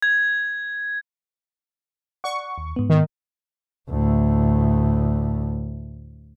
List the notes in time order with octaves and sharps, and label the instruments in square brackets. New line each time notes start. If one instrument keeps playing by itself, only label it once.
[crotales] G#6
[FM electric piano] D5 F#5 [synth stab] C#6
[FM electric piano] D#2
G#2 B3
[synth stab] D#3
[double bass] D2 A2